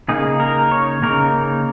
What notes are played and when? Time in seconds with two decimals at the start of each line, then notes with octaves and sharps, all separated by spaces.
0.08 C#3 A#3 D#4 G#4
0.40 A#4
0.72 C#5
1.02 C#3 A#3 D#4 A#4